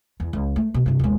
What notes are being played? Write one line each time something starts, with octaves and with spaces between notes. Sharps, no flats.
E2
C#2
A3
B2
G2 C3
D#1 G#3